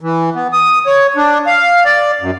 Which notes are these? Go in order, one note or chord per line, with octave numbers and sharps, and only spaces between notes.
E3
B3
D#6
C#5
D4
F5
D5
F#2